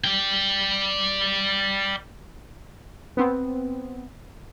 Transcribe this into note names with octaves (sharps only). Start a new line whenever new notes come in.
D5 G5
B3 C4